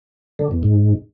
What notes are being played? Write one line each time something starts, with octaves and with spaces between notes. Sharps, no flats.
D3
E2
G#2